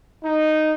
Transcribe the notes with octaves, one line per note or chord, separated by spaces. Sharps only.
D#4